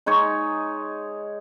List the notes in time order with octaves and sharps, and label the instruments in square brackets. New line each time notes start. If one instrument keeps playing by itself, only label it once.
[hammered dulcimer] G#3 D#4 G#4 C#5